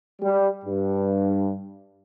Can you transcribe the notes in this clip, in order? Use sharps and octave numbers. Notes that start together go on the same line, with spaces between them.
G3
G2